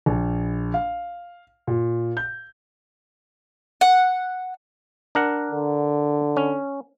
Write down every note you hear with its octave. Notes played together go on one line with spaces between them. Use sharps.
A#1
F5
A#2
G6
F#5
D4 A#4 F#5
D3
C#4